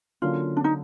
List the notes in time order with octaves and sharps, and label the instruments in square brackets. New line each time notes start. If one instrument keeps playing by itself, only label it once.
[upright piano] D3 F#3 A#3 C#4 [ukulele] F4
[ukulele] D4
D#4